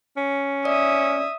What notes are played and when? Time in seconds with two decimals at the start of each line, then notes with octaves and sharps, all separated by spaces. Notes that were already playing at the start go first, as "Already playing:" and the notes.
0.17 C#4
0.65 D5 E5 D#6